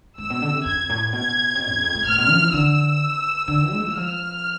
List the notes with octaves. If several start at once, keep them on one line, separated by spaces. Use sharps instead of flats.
G#2 E6
B2
D3
C3
F2 G#6
A2
B2 G#6
C3
B2
E2
F2
A2
A2 F6
B2
F3
E3
D3 E6
D3
G#3
F3
E3
F3 F6